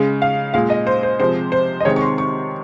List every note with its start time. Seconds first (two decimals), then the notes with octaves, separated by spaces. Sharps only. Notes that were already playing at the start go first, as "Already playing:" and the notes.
Already playing: C#3 G#3
0.22 F5
0.54 A#2 G#3 F5
0.70 D#5
0.87 C5
1.03 C5
1.20 C3 F3 G#3 C5
1.52 C5
1.80 D#5
1.85 C3 D#3 G#3 C#5
1.96 C#6
2.02 C6
2.18 C#6